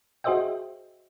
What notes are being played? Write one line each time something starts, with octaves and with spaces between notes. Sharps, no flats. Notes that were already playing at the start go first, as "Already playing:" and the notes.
F#4 G#4 C5 D#5 E5 G5